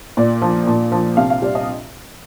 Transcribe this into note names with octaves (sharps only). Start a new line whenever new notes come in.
A#2 D5
F3
A#2
F3
C3 F5
F5
G3 D5
D#5